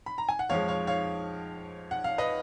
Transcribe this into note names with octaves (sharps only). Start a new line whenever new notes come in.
B5
A#5
G#5
F#5
F2 F3 G#3 C#5 F5
C#5 F5
C#5 F5
F#5
F5
B4 D#5